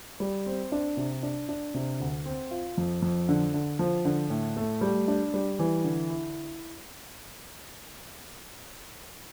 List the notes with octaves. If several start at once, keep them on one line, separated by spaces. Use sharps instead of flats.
G3
C4
D4
C3
D4
D4
C3
D2
C4
F4
F2
F2
D3
D3
F3
D3
A2
A3
G3
D4
G3
E3
D3
E4